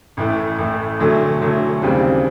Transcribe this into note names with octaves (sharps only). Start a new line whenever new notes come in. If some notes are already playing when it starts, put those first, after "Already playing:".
A1 A2 E3 A3
A1 A2 E3 A3
E1 D2 D3 F#3 A3
E1 D2 D3 F#3 A3
D#2 C#3 E3 G3 C4